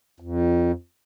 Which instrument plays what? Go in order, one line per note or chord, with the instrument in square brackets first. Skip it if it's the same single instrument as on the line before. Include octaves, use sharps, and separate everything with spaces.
[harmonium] F2